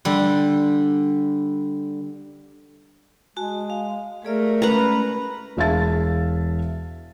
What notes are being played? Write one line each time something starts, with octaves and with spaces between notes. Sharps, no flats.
D3 G3
G#3 F#4 G#5 A5
F5
A3 G#4 A#4 D5 E5
G#3 C#4 B4 A#5
E1 G#4 E5 F5 A5 A6